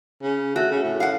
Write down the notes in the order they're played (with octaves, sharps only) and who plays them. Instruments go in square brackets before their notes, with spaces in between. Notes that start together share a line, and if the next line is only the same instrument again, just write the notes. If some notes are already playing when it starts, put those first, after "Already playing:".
[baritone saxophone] C#3
[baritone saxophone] A3 [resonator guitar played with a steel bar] F#4
[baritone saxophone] C#3
A2
[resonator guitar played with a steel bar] F5 F#5